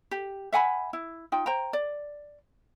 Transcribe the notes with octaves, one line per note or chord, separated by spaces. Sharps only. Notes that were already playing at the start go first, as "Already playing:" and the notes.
G4
E5 F#5 G#5 B5
E4
D#4 F4 G5
C5 G5 A#5
D5